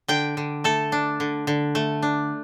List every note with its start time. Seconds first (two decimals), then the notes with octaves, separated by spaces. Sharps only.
0.08 D3 G5
0.37 D3
0.64 A3 A4
0.92 D4
1.20 D3
1.47 D3
1.75 A3
2.02 D4